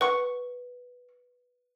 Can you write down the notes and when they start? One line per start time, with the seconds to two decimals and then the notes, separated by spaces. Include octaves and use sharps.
0.01 B4 F#5 C#6